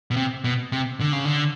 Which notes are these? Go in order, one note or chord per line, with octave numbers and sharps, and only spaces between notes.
B2
C3
B2
C3
D3
C#3
D3